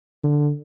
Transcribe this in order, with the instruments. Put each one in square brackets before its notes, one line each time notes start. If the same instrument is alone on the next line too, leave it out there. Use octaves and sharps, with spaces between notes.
[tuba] D3